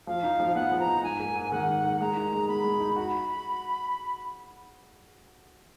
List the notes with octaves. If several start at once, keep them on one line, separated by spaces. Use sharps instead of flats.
F3 F5
D#4
F3
B3 F#5
F3
A#5
D#4
G#2 G#5
A#3
G#2
D#3 F#5
G#2
A#3
G#3 A#5
D#4
G#3
B3 B5
G#3
D#4
F#4 B5